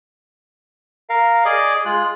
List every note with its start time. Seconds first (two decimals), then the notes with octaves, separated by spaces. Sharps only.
1.10 A#4 F5
1.45 G#4 D5 D#5
1.85 G#3 F4 F#6